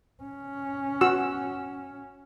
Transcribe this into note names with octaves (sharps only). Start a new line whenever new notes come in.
C#4
F#4 E6